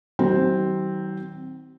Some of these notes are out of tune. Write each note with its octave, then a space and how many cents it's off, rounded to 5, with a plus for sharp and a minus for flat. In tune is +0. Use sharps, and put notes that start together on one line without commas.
D#3 +35 F#3 +45 C4 +0